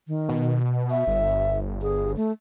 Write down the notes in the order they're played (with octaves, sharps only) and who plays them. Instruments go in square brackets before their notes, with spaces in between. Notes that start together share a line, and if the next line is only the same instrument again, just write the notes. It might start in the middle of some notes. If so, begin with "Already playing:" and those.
[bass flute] D#3
[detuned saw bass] B2
[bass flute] E5
[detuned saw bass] G1
[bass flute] G#4
A3